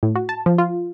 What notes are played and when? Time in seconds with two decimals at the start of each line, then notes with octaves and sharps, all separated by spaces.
0.03 A2
0.15 F#4
0.29 A5
0.46 F3
0.58 F4